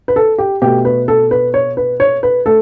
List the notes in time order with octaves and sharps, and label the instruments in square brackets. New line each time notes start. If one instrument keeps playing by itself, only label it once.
[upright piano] B4
A4
G4
B2 A3 G4
B4
A4
B4
C#5
B4
C#5
B4
A3 A4